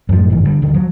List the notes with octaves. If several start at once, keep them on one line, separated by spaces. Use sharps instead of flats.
F#2 A2 D#3 F3
F#1 G#2 D#3 E3
D3 E3 G3
D1 D3 D#3 G3
F3 F#3